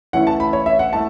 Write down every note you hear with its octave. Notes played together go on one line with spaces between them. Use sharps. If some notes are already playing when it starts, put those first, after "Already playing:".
E3 A3 C#4 E4 F#5
A5
B5
C#5
E5
F#5
A3 E4 A5